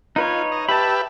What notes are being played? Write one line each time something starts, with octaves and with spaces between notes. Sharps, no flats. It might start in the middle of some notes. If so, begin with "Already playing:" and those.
D#4 F4 B4 C#5
D#5
G4 B4 E5 A5 B5